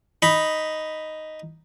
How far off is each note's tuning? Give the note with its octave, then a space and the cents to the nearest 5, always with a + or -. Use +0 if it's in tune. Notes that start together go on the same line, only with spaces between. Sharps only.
D#4 +0 B5 +0